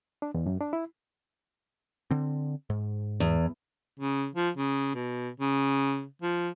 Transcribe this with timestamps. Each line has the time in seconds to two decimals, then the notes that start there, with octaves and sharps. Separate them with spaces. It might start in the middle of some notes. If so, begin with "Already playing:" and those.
0.22 D4
0.34 E2
0.46 F#2
0.61 D4
0.73 E4
2.11 D3 C4
2.70 G#2
3.20 E2
3.99 C#3
4.35 F3
4.57 C#3
4.95 B2
5.40 C#3
6.22 F3